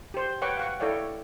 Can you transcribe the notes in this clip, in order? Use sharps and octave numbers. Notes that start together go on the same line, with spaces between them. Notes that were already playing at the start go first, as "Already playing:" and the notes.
G4 C5
B4 C#5 F#5 G5 C#6 D6
F5 F#5 C#6
E4 A4 C#5 D5 F5 G5